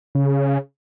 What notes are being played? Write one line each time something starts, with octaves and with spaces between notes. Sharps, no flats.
C#3